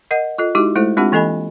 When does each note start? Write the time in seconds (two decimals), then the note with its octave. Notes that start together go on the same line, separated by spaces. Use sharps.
0.11 A#4 D#5 F#5
0.38 F4 A4 D#5
0.55 G#3 D#4 E4 F#4 G4 D6
0.75 G#3 A3 E4 A4 C5
0.97 G#3 C4 D4 F4 G4 F#5
1.12 E3 A#3 A4 D#5 G#5 B5